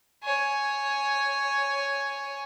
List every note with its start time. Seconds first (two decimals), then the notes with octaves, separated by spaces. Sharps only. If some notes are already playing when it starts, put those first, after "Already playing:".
0.23 C#5 G#5